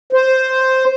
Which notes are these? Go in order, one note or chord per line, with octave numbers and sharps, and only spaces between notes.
C5